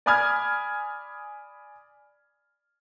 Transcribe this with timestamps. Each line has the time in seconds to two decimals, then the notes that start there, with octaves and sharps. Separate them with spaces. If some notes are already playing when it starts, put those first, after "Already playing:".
0.06 D5 G#5 B5 D#6 F6 G#6